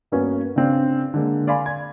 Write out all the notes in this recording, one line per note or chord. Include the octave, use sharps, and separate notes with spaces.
G2 A#3 B3 C#4 F#4
C#3 C4 D4
D3 G#3 A#3
D5 F5 G#5 B5 C6
G#6